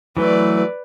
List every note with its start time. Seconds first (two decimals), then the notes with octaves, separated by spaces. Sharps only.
0.17 E3 F#3 A3 B4 D5